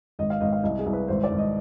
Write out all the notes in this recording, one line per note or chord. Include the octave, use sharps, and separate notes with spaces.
G#1 D#5
F5
G#1 D#5
F5
C2 D#5
G#4
C2
B4
G#1 C5
D5
G#1
D#5